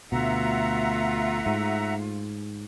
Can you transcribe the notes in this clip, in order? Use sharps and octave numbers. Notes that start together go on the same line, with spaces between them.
D2 B2 A3 F4 E5 F#5 A#5
G#2